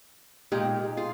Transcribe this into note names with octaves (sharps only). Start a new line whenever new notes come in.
A#2 G#3 D#4 G4
F4 G#4